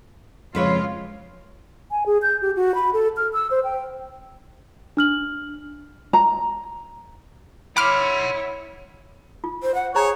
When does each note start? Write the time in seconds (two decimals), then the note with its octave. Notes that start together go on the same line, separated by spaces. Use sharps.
0.55 F2 C#3 G#3 F4 B4 C#5
1.91 G#5
2.06 G#4
2.22 G6
2.42 G4
2.56 F#4
2.75 B5
2.93 A4
3.17 F6
3.33 E6
3.51 C5
3.64 G5
4.97 D4 F6 F#7
6.13 A#5
7.77 E4 C#5 F#5 B5 C6 D6 F6
9.44 F4
9.63 C5
9.75 F#5
9.95 G#4 C5 C#5 A#5